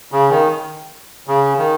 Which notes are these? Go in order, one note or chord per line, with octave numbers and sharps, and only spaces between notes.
C#3
D#3
C#3
D#3